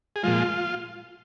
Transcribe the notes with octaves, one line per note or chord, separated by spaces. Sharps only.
G#4
A#2 F3 G#3 F4